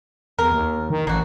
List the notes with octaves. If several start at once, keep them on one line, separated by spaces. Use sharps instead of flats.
E2 A#4
D#2
D#3
A1 A#3 F#4